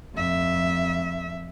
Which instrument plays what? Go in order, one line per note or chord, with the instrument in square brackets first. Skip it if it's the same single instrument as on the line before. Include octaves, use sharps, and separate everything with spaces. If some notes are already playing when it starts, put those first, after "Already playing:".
[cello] F2 E5